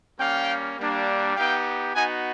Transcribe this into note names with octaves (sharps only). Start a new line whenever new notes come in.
G3 A#3 C#4 F5 G5
G3 A#3 D4
B3 D#4 G4 F5 G5
B3 D#4 F#4 F#5 G#5